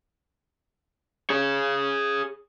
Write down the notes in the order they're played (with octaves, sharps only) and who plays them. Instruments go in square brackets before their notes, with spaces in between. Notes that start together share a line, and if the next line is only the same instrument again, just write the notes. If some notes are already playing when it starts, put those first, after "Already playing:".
[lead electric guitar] G#4 C#5